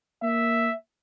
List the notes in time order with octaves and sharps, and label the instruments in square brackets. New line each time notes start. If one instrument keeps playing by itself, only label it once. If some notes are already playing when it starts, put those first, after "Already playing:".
[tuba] A#3 [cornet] E5